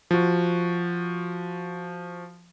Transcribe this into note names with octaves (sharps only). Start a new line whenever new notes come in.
F3 F#4